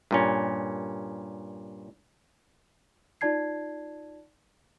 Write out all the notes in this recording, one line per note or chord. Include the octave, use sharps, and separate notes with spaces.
G2 A#2 C#4
D#4 F4 D5 A5 G#6 C7